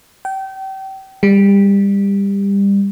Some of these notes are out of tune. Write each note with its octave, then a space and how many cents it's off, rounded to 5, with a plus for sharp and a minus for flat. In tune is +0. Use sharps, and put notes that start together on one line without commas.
G5 -30
G3 +25